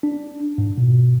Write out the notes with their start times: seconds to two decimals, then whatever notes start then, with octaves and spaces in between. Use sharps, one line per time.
0.03 D4
0.58 G#2
0.78 B2